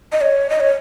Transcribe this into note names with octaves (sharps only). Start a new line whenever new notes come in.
D#5
C#5
D#5
C#5